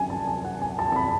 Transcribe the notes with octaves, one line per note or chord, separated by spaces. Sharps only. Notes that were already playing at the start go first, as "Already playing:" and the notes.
Already playing: F#2 F#3 G#5
A5
G#5
F#5
G#5
A5
A5
B5